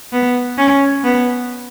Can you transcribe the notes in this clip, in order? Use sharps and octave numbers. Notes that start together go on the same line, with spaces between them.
B3
C#4
B3